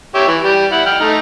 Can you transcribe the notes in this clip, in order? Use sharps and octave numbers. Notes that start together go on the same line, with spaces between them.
G4 C#5 E5
E3
G3 G4
E4 F#5
G5 F6
A3 D#4